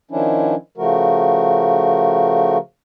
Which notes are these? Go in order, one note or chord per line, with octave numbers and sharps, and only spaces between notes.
D#3 F3 C#4 D4 E4
C#3 F3 A3 F#4 A#4